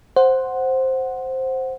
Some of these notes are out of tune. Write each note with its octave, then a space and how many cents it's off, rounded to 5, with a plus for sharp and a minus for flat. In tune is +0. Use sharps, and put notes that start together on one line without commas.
C5 +5 F#5 +0